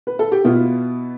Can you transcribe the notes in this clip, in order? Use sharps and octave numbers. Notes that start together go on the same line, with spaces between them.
B4
A4
G4
B2 B3 E4 F4